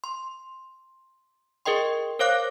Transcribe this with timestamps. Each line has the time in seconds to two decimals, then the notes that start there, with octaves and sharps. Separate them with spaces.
0.04 C6
1.65 G#4 A#4 D#5 G5 C6
2.19 A#4 C5 C#5 F5 D6 F#6